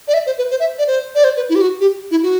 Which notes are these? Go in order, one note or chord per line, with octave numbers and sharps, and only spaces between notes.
D5
E5
C5
B4
C5
E5
D5
C5
D5
C5
B4
E4
G4
F#4
G4
E4
F#4